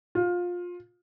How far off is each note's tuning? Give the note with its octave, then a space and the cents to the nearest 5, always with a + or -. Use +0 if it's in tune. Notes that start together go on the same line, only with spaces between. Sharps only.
F4 +20